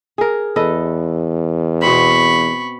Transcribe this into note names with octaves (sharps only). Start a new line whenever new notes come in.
G#4 A#4
E2 A4 B4 D#5
B2 C4 B5 C#6